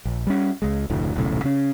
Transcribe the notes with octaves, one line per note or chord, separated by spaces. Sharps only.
A#1
G3 C#4
C#2 G#3
F1 D2 A2
D#1 B1 A2 C#3
C#3 C#4